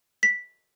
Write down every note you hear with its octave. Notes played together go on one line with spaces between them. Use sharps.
B6